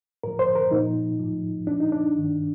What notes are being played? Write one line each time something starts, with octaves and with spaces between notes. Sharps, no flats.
A2 F3 A#4
C5
A#4
A#2 F3 D#4
A2 F3
A#2 F3 D4
D#4
D4
G2 D#3